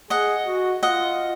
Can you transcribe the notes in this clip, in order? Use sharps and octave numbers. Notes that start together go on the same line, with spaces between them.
G#4 D#5 F#5
F#4
F4 D#5 F#5